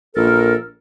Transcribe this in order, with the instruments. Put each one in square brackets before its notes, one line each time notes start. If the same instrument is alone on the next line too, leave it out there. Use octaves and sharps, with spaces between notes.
[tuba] A#1 [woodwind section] A4 A#4